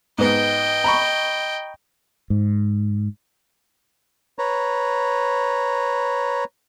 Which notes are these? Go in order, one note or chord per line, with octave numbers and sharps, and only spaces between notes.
G#2 B3 D#5 G5
A#5 B5 C#6
G#2
B4 C#5 A#5